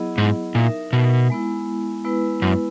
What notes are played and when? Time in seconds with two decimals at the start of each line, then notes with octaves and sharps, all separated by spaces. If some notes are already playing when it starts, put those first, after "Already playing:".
Already playing: F#3 B3 E4 G#4 D#5
0.18 G#2
0.55 A#2 D#4 A#4 E5
0.93 B2
1.30 G#3 B3 E4
2.05 G#3 B3 E4 B4
2.42 F#2